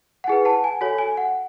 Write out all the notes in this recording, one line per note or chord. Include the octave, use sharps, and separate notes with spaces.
F#5
E4 G#4 B4 G#5
F#5 A5
G#5
F#4 A4 C#5 G#5
G#5
F#5